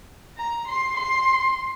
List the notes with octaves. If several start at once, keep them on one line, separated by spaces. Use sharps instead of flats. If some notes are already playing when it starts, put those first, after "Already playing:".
A#5
C6
C6